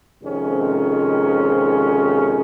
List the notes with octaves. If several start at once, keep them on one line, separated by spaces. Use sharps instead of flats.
F2 C3 D#3 G#3 C#4